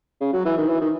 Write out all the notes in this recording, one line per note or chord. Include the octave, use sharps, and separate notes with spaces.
C#3
F#3
E3
D#3
E3
D#3